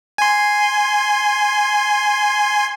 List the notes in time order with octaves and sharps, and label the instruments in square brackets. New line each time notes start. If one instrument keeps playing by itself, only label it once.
[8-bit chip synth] G#5 C6